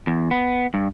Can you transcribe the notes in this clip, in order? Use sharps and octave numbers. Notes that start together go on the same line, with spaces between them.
E2
B3
G2